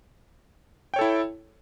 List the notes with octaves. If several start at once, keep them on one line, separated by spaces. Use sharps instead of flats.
E4 A4 C#5 G5